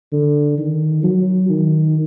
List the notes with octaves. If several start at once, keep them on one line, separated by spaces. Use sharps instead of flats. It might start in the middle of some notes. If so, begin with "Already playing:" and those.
D3
D#3
F#3
D#3